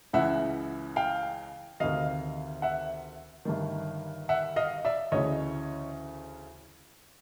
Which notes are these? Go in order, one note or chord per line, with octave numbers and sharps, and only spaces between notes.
C#2 C#3 E3 E5 F#5
F5 G5
D2 C3 D#3 D#5 F5
E5 F#5
G1 G2 D#3
E5 F#5
D#5 F5
D5 E5
D2 C#3 E3 C#5 D#5